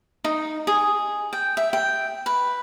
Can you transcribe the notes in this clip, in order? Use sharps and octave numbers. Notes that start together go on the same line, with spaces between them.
D#4
G#4
G5
E5
G5
B4